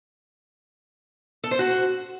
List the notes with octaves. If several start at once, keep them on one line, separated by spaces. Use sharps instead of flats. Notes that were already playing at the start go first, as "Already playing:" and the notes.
A4
C5
F#4